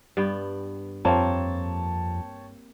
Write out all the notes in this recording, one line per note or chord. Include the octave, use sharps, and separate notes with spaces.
G2 B3 G5
F2 A#3 C4 C#5 G5 A5